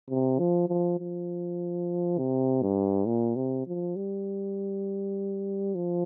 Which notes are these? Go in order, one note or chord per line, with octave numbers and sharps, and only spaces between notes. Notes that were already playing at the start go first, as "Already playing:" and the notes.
C3
F3
F3
F3
C3
G2
A#2
C3
F3
G3
F3